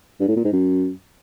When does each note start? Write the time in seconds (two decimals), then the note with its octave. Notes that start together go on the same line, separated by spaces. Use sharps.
0.20 G2
0.28 A2
0.36 A#2
0.44 G#2
0.52 F#2